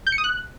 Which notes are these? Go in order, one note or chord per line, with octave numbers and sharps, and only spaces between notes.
G6
C#7
D#6
F#6